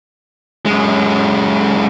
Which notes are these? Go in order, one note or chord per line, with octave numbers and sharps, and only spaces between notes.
F#2 G#3